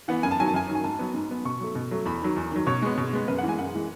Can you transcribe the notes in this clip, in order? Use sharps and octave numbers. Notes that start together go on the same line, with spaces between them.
E3 B3 F#5
F#2 G#5
A5
D#3 F#3 G#5
A5
F#2 G#5
D#3 F#3
G#5
G#2 A5
F#3 B3
G#2
F#3 B3
B2 C#6
F#3 A3
B2
F#3 A3
E2 B5
D#3 F#3
E2
D#3 F#3
B2 C#5
G#3 B3
B2
G#3 B3
F#2 B4
F#5
E3
G#3 G#5
F#2 F#5
E3 G#3